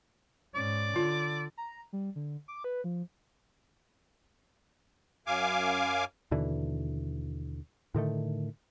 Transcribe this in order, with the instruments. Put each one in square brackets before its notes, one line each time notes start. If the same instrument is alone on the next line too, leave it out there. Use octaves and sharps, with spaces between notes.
[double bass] G#2 C#4 [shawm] D5
[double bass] D3 [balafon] F4
[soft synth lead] A#5
G3
D3
D6
B4
F3
[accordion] F#2 F5 G#5 D6
[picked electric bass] D#2 B2 D3 E3
A2 D3 D#3 A3